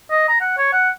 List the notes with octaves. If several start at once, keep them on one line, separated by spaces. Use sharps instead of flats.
D#5
A#5
F#5
C#5
F#5